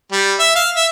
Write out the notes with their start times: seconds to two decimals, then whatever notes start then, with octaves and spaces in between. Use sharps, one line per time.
0.12 G3
0.39 E5
0.55 F5
0.76 E5